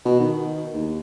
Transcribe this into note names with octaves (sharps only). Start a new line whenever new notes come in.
B2
D#3
D#2